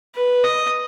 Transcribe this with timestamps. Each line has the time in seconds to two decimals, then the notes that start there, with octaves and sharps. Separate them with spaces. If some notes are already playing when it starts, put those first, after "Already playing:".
0.15 B4
0.44 D#5